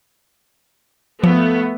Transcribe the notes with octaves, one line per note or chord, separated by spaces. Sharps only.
F3 A3 B3